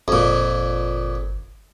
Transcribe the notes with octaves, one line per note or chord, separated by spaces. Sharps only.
G1 F2 A#2